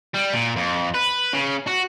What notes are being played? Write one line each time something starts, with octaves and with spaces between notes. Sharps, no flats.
G3
A#2
F2
B4
C#3
F#4